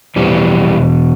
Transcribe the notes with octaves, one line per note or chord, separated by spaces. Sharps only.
E2 B2 E3 G3